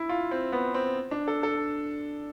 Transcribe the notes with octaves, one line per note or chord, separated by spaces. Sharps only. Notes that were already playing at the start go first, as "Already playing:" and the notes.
Already playing: E4
F4
C4
B3
C4
D4
A4
A4